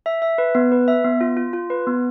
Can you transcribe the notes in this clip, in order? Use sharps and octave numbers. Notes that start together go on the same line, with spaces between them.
E5
E5
B4
B3
B4
E5
B3
F4
F4
F4
B4
B3